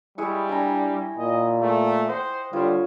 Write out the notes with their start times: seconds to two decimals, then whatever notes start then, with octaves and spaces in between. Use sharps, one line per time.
0.18 G3 G#3 E4 C#6
0.49 D4 G5 G#5 A#5
1.18 A#2 D#5
1.61 G#3 A3
2.08 C5 D#5 F#5 G5
2.53 D3 G3 F4 C5 C#5